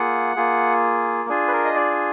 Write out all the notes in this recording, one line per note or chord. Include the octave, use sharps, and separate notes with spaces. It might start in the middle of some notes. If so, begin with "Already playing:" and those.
Already playing: A#3 F4 G#4 F#5
A#3 F4 G#4
D4 F4 G#4
B4
A#4
D#5
D5